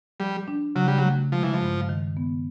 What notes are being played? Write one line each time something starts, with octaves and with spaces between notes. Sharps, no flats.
F3 G3
D4
C#3 F#3
G3
F#3
A3
F3 G#3
E3
F3
G2
D#3
B3